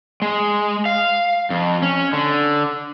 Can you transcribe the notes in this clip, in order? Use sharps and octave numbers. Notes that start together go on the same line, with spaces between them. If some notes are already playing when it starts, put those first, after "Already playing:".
G#3
F5
F2
C#4
D3